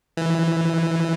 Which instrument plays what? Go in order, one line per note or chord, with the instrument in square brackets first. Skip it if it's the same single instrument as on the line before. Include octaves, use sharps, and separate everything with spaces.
[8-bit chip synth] E3